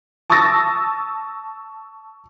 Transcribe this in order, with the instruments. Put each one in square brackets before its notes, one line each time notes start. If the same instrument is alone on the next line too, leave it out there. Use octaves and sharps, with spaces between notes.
[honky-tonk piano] A5 C#6 D#6 E6 A6 A#6